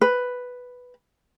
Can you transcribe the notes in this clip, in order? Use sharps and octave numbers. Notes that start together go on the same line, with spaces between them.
B4